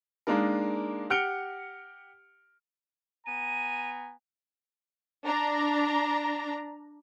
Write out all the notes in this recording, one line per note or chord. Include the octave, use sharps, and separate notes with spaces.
G#3 A#3 D4 D#4 A#4
G4 F#5 F6 C#7 D7 G7
B3 G#5 A#5 D#7
D4 A#5